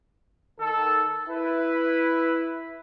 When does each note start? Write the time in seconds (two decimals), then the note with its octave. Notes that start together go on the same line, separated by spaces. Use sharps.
0.60 D#3 A4
1.29 E4 B4